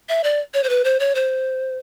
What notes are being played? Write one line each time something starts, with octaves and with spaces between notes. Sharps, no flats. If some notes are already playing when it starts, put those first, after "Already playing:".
E5
D5
C#5
C5
B4
C5
C#5
C5